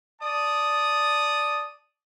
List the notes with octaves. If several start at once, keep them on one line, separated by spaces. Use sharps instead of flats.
D5 A5 D#6